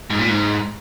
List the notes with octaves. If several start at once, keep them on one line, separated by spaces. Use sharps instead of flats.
G#2
A#2
G#2